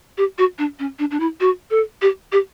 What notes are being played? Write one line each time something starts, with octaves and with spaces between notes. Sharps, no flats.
G4
F#4
D4
C#4
D4
D4
E4
F#4
A4
G4
G4